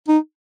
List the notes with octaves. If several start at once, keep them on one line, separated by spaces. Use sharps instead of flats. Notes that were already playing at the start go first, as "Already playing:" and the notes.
D#4